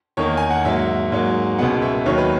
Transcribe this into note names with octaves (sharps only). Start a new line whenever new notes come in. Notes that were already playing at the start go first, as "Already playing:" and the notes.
E2 D#3 A#3 C#5
G#5
F#5
G#2 F#3 A#3 E5
G#2 F#3 A#3
C#2 B2 G#3 B3 F#5
E5
D#2 D#3 F#3 C#5
B4